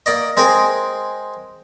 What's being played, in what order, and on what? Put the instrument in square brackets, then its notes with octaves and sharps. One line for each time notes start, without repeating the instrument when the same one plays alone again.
[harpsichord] A#3 D5 D#5
G#3 C4 G#4 A#4